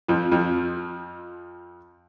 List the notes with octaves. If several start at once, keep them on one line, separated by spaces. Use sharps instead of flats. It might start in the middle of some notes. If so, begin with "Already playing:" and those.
F2 F3
F2 F3